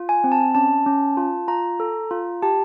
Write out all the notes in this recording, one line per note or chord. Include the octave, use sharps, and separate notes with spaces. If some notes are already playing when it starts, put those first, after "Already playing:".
Already playing: F4
G#5
C4
A5
C#4 A5
C#4
F4
F4 A#5
A4
F4
G4 A5